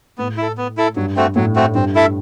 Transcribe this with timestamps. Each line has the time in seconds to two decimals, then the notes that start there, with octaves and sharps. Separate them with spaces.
0.18 A2 B3
0.37 E4 A4
0.58 B3
0.77 E4 A4
0.96 G2 F#3
1.16 A3 C4 F#4
1.35 A2 F#3
1.56 A3 C4 F#4
1.75 G2 C4
1.95 E4 A4 E5